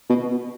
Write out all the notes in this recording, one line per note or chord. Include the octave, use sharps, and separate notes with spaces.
B2